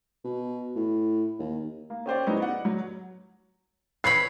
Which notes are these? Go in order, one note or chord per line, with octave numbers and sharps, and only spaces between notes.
B2
A2
D#2
A#3
C#4 G4 C5 D5
F#3 G#3 B3 C#4 D#4 E4
D5 F#5
F#3
B4 C#5 B5 C7